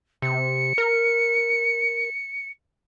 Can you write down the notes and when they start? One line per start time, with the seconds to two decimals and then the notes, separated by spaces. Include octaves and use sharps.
0.22 C3 C#7
0.78 A#4